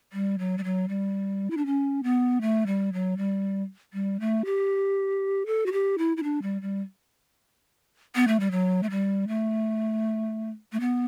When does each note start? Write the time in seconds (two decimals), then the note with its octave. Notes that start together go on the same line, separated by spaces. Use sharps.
0.13 G3
0.39 F#3
0.58 G3
0.64 F#3
0.88 G3
1.50 E4
1.57 D4
1.66 C#4
2.03 B3
2.41 A3
2.67 G3
2.93 F#3
3.17 G3
3.93 G3
4.20 A3
4.45 G4
5.46 A4
5.66 F#4
5.72 G4
5.98 E4
6.17 E4
6.23 D4
6.42 G3
6.62 G3
8.15 B3
8.28 A3
8.40 G3
8.51 F#3
8.83 A3
8.90 G3
9.28 A3
10.72 A3
10.80 B3